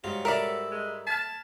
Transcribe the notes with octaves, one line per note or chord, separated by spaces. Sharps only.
G#2 F#3 G3 F4
A4 A#4 D5 E5 B5
G#3
A5 F6 G#6 B6